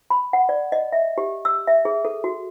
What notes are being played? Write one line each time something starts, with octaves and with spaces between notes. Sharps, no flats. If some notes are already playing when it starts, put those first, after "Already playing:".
B5
F#5
D5
D#5
E5
G4
E6
E5
G#4
A4
F#4